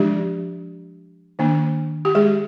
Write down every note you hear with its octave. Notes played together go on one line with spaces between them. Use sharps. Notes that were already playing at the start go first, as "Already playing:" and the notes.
Already playing: F3 G#3 D4 G4
D#3 A#3 D4
G4
G#3 G#4